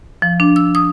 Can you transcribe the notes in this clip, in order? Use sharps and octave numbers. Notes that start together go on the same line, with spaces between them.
F3
D4
E6
D#6